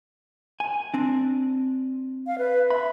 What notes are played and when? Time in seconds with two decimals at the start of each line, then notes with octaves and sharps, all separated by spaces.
0.60 G#5
0.94 C4 D4
2.27 F5
2.38 B4
2.70 E5 B5